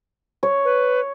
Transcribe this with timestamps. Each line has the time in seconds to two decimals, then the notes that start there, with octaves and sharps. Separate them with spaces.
0.43 C#5
0.65 B4